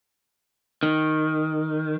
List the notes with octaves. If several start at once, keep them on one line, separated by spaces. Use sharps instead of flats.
D#3